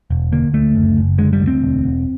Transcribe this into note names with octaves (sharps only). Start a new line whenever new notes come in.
E1
D3 A#3
D2 A3
F#1
F#1
D3 G#3
G3
D2
C4
E1
E1